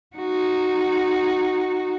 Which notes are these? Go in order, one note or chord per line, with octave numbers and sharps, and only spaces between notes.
D#4 F#4